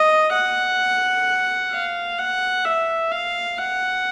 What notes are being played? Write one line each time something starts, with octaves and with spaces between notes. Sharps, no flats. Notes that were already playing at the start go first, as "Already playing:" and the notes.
Already playing: D#5
F#5
F5
F#5
E5
F5
F#5